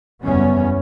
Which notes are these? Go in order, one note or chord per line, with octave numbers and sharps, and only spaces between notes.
F#1 E2 G3 B3 C#4